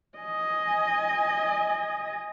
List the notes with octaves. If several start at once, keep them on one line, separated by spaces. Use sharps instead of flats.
D#5 G#5